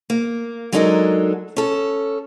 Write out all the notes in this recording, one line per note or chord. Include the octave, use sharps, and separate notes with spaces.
A#3
F#3 G#3 D4 D#4 A4 A#4
C#4 A4